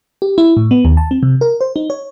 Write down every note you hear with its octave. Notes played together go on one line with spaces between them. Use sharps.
G4
E4
A2
B3
D#2
A5
C4
C3
A#4
C5
D#4
C#5